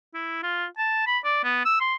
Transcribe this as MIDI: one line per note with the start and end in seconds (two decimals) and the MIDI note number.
0.14 0.38 64
0.43 0.65 65
0.78 1.02 81
1.07 1.19 83
1.25 1.40 74
1.44 1.63 59
1.66 1.80 88
1.81 1.95 84